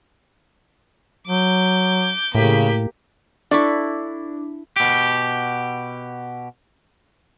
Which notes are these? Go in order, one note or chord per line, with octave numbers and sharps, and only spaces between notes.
F#3 D6 G6
A2 C#3 A#3 G4
D4 E4 A4 D5 C#6 D6
B2 G4